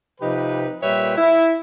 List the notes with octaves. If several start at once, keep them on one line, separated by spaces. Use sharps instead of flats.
C3 F3 D#4 G4 B4
A#2 G3 B4 C#5 E5 G5
E4